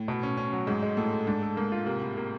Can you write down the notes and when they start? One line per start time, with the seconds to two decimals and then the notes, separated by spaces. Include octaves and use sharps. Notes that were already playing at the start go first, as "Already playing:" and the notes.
Already playing: A2
0.08 B2
0.23 C#4
0.37 C#4
0.52 F#3
0.67 G#2 G#3
0.83 G#3
0.97 A2 A4
1.11 A4
1.27 G#2 D4
1.43 A4
1.56 G#2 A#3
1.72 F4
1.86 C3 A#3
2.01 A2
2.17 A#3